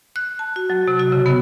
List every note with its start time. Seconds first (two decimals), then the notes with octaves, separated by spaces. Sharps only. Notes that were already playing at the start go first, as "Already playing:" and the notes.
0.16 F#6
0.39 A5
0.56 F#4
0.70 F#3
0.88 C3
1.00 F#4
1.12 C#3
1.26 B3